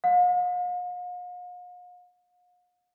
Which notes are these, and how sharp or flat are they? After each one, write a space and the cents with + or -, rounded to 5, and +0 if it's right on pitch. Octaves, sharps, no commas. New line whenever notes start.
F5 +45